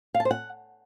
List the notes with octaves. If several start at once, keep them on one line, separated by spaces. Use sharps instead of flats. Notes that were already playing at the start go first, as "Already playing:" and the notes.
F5
A5
C5
F#5